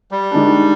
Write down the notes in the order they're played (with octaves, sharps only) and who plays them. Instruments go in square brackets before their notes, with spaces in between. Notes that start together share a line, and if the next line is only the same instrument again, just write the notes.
[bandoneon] G3
[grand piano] D#3 G#3 D4